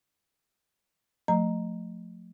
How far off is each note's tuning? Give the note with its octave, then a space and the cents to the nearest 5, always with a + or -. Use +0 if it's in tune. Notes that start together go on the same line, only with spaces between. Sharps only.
F3 +35 A3 +15 A#5 +0